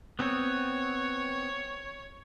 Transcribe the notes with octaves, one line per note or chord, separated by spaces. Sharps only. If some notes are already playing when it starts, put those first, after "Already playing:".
B3 C4 C#5